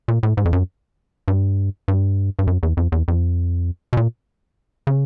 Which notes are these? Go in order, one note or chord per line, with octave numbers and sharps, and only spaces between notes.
A#2
A2
G#2
F2
F#2
G2
G2
G2
F#2
E2
F2
E2
F2
B2
A#2
C#3